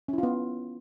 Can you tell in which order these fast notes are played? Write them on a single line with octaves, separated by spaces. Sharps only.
C#4 E4 F4 B3